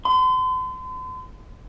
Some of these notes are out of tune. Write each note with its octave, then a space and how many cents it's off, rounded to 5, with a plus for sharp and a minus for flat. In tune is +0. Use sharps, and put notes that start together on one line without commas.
C6 -40